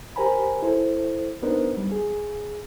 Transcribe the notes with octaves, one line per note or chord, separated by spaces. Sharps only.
G4 A#4 C5 G#5 A#5 B5
E4 A4 C5
B3 D4 D#4 A#4 C5
G3
G#4